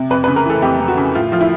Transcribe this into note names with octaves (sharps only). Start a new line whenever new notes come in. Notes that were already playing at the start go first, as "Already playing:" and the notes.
Already playing: C3
F2 B4
B4
C#3
A#4
E3 A4
F2 G4
F2
F#4
C#3
A2 F4
F3 F4
E4